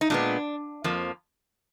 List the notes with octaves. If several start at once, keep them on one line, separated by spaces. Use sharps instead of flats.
D#4
A#2 G#3 B3 D4
F2 F3 A#3